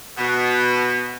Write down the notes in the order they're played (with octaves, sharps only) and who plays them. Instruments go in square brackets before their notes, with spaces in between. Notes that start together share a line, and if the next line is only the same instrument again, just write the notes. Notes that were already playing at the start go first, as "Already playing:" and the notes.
[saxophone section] B2